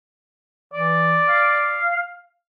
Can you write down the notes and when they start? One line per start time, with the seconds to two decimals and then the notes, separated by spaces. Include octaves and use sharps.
0.74 E3 D5
1.28 F5